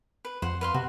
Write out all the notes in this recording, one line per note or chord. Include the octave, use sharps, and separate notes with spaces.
B4
F2 C5 F#5
B4 F5 C6
C3 F#4